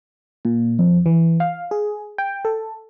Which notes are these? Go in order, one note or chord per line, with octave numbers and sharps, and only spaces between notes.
A#2
F2
E3
F5
G#4
G5
A4